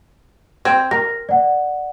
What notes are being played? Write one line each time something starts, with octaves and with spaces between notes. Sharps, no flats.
C4 G#6
A#4 A#6
D5 F#5